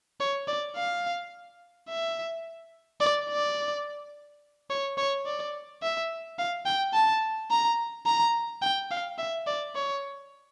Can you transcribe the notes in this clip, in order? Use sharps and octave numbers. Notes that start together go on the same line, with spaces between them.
C#5
D5
F5
E5
D5
D5
C#5
C#5
D5
E5
F5
G5
A5
A#5
A#5
G5
F5
E5
D5
C#5